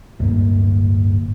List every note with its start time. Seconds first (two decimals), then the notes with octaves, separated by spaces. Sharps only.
0.19 D1 G2 A#3